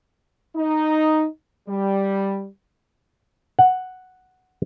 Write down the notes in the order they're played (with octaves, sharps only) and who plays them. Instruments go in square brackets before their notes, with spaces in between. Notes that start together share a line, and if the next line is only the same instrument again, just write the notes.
[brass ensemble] D#4
G3
[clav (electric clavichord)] F#5